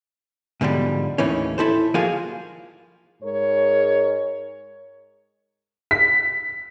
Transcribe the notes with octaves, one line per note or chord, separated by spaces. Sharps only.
G#2 B2 D3 F3 G3
D#2 A2 D#3 E3 C#4
E4 A4 C5
F3 A#3 F4 F#4 G#4 F5
G#2 G#3 A#4 C#5
B6